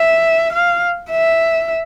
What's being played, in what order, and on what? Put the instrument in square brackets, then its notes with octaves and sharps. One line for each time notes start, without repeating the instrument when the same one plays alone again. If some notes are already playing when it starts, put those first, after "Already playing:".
Already playing: [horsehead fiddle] E5
F5
E5